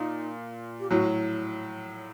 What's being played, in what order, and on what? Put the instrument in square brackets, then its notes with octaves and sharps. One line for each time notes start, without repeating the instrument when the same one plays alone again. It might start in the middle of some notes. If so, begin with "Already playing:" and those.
Already playing: [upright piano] A#2 [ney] D#4
[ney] G4
[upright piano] A2 F#3 [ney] F#4